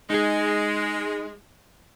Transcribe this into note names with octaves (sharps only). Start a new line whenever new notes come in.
G#3 D#4 G#4